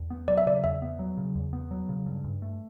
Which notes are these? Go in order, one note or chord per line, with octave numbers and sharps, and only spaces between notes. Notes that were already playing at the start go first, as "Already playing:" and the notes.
Already playing: E2
B3
F#3 D5
E5
C#3 D5
E2 E5
B3
F#3
C#3
E2
B3
F#3
C#3
G2
G2
A3